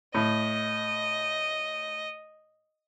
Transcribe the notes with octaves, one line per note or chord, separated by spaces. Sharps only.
A2 D#5